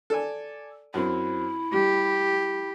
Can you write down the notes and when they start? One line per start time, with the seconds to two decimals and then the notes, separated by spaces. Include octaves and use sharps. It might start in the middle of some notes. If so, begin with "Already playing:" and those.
0.10 A4 D5 G#5
0.94 F#2 C4 E4
1.74 G3 G4